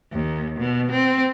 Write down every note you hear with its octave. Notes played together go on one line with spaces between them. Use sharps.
D#2
B2
C4